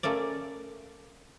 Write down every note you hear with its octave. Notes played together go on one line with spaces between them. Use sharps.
A3 A#3 C#4 D5